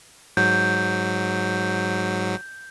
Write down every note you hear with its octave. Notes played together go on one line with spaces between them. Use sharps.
G#2 F#3 G6